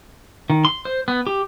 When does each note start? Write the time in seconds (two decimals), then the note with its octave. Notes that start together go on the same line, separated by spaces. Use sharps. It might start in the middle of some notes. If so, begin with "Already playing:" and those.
0.50 D#3
0.65 C6
0.85 C5
1.08 B3
1.27 G4